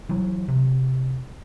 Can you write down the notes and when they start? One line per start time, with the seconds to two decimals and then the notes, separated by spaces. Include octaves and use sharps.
0.09 E3 F#3
0.48 C3